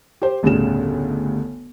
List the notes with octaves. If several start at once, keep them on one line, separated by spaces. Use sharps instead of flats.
G4 C5
G1 D2 A2 C#3 G3 E7